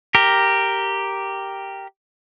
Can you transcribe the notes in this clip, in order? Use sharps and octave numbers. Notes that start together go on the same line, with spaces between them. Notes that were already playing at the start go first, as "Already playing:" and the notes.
G4 A#4